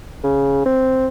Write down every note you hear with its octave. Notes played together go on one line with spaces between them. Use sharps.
C#3
C4